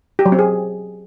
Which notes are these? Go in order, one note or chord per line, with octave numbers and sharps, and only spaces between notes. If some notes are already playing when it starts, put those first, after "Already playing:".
G4
F#3
C4
G#4